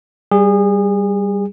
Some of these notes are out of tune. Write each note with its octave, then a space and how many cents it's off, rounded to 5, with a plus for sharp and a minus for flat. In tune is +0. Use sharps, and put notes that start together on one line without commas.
G3 +0 G#4 -30